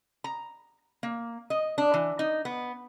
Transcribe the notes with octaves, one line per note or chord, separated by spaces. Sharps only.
A#5
A#3
D#5
D4
E3
D#4
B3